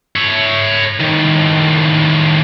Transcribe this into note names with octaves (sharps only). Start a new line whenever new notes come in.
C#5 E5
A2 D#3